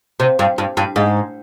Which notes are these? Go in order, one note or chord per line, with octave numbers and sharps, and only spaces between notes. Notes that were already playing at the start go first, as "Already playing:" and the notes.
C3
G2
G2
G2
G#2